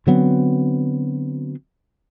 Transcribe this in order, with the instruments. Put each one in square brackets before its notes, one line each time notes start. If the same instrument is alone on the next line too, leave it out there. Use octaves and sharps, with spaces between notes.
[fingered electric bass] D3 F#3 B3 C4